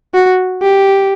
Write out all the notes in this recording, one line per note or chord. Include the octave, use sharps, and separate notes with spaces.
F#4
G4